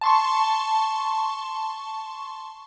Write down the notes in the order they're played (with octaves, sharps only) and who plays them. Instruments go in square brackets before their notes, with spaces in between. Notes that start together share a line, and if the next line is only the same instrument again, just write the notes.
[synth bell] A5 C6 C#6